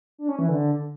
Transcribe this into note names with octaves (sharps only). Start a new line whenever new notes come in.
D4
C#4
E3
D3